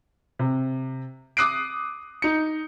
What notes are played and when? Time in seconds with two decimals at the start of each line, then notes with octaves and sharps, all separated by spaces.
0.39 C3
1.37 D6 D#6 F#6 C7 D7
2.22 D#4 C#7